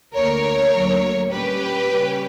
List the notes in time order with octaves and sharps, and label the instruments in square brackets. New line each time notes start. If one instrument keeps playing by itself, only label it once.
[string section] D2 D3 A#3 A#4 C#5
D2 D3 F#3 A#3
A#2 G3 C#4 G4 B4
C#3 G3 C#4